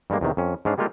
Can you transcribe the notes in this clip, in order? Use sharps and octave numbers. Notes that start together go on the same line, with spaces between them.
G2 G3 G#3 A#3
E2 C3 D#3
F2 C#4
G#2 C#4 D4 F5
G3 G#3 A#3 F4 G4 A4